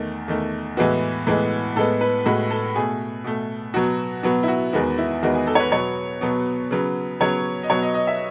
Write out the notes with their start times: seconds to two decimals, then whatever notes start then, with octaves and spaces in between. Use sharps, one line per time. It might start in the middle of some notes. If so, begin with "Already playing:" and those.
Already playing: E2 D#3 A3
0.28 E2 D#3 A3
0.77 A2 E3 G#3 B3 F#4
1.27 A2 E3 G#3 B3
1.76 A2 G#3 B3 A4
2.01 B4
2.26 A2 G#3 B3 F#4
2.51 A4
2.75 B2 A3 G#4
3.24 B2 A3
3.74 B2 F#3 B3 F#4
4.23 B2 F#3 B3 F#4
4.43 E4
4.48 F#4
4.73 E2 D#3 G#3 B3 F#4
4.98 E4
5.22 E2 D#3 G#3 B3 F#4
5.35 G#4
5.47 A4
5.55 C#5
5.60 B4
5.71 B2 F#3 B3 C#5
6.21 B2 F#3 B3
6.71 C#3 F#3 B3
7.20 C#3 F#3 B3 C#5
7.63 D#5
7.70 B2 F#3 B3 C#5
7.83 D#5
7.94 D#5
8.07 E5